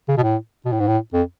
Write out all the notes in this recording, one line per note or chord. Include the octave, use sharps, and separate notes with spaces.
C#3
B2
A2
B2
A2
G#2
A2
F2